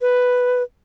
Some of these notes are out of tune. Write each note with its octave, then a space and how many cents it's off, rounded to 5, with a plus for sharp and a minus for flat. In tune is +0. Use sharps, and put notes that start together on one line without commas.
B4 +5